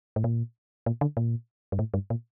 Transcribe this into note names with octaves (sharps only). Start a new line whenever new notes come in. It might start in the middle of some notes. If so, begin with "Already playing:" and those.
A2
A#2
A#2
D3
A#2
G2
A2
G2
A#2